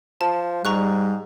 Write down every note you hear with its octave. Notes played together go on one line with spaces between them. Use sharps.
F3 A5
G#2 G3 A#5 C#6 F#6